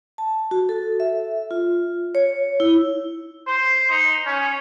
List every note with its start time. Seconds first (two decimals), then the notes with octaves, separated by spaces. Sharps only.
0.18 A5
0.51 F#4
0.69 A4
1.00 E5
1.51 F4
2.15 C#5
2.60 E4
3.47 C5
3.90 D#4
4.26 C#4